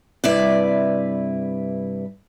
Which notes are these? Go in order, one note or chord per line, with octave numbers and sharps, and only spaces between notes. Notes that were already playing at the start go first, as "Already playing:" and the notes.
G2 C3 E4 B4 D5